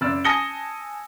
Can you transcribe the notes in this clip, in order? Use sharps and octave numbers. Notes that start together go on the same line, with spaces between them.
F#1 D5 E6
G#5 A5 D#6 A#6 C#7 G7